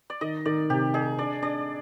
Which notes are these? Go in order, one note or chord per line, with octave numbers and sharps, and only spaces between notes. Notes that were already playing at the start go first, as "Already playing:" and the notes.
D5
D#3 D#5
D#3 D5
C3 G4
D#4 G#4
D4 D5
D4 D5